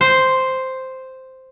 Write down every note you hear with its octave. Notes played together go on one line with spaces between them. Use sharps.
C5